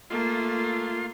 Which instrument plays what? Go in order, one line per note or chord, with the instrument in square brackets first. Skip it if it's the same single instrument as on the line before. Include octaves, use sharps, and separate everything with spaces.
[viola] A3 A#3 [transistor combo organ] F4 C6